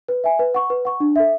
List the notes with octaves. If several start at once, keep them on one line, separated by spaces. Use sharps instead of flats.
B4
E5 G#5
B4
F#5 C#6
B4
F#5 C#6
D4
A4 E5